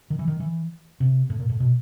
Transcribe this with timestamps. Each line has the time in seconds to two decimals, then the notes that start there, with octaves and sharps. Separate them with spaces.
0.10 D#3
0.19 E3
0.28 D#3
0.40 E3
1.00 C3
1.30 A2
1.39 A#2
1.49 A2
1.60 B2